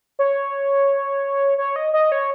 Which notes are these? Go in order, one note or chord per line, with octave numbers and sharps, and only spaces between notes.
C#5
C#5
D#5
D#5
C#5